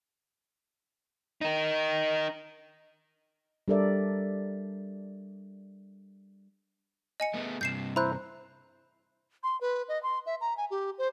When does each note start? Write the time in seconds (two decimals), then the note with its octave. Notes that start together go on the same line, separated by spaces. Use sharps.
1.41 D#4 A#4
3.68 G3 D4 A4 A#4 D5 E5
7.20 D#5 G#5 C#7
7.34 A3 B3 G#4
7.61 G2 C3 G6 C7 E7
7.96 E4 C5 A#5 F#6
9.43 C6
9.61 B4
9.89 D#5
10.03 C6
10.26 E5
10.41 A#5
10.57 G#5
10.71 G4
10.98 C5